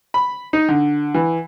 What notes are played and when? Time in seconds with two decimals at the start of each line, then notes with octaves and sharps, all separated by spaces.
0.14 B5
0.53 D#4
0.68 D3
1.14 E3